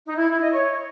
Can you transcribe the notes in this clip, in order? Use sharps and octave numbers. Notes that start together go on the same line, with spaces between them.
D#4
E4
E4
D#5
C#5